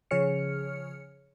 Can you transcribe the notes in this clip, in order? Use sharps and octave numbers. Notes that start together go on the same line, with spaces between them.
C#3 F3 G#4 C#5 F6 C#7